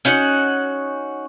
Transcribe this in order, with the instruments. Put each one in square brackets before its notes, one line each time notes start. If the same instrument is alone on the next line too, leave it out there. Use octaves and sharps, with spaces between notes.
[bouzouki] C#4 D#4 F#4 F#5